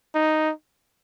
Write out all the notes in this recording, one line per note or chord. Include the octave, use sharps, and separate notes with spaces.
D#4